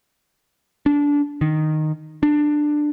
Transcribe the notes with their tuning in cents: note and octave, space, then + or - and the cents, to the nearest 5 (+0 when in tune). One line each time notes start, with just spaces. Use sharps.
D4 -20
D#3 -10
D4 +15